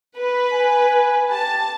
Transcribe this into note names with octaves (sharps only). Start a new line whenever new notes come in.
B4
G#5
G4 A5